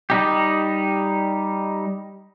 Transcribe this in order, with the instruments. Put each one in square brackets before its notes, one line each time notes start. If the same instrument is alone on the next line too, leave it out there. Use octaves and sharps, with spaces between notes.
[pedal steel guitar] G3 D#4 G4